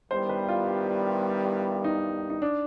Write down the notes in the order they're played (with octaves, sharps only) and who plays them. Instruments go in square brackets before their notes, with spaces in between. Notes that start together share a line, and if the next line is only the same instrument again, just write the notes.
[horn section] G2 D#3 G3 B3 E4 [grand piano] C5
[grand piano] B4
F4
D#4
D#4
D4